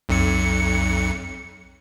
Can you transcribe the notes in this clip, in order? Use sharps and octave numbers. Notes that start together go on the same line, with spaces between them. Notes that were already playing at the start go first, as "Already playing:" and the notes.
B1 F2 C#7